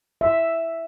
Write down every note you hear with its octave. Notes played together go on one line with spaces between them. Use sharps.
E5